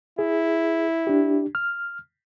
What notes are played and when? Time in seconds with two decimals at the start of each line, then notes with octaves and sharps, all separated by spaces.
0.19 E4 G#4
1.07 D4 G4
1.55 F6